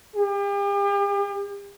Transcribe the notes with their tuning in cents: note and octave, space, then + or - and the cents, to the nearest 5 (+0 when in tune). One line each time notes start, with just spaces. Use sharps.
G4 +40